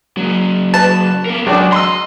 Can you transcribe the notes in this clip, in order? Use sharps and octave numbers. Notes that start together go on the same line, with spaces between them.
F#3 A#3
B4 A5
B3 A#4
C#2 F#3 D4
D#5 C6 E6